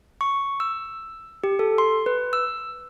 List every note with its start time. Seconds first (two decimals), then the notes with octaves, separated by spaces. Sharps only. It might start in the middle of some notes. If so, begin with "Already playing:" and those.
0.21 C#6
0.60 E6
1.44 G4
1.59 A4
1.78 C6
2.06 B4
2.33 E6